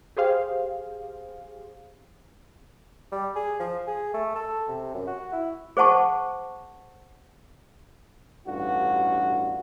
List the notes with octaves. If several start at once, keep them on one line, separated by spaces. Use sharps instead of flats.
G4 G#4 C5 F5
G3
G#4
F3
G#4
A3
A4
C3
F#2
F#4
E4
G#4 C5 F#5 A5 C#6
A1 G2 D3 F4 F#4